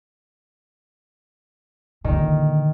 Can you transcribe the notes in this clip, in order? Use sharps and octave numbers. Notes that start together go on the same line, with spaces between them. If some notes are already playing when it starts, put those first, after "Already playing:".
A#2 D3 D#3